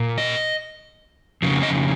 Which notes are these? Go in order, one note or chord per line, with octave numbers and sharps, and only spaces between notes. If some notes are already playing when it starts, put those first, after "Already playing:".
Already playing: A#2
D#5
F2 C#3
D#5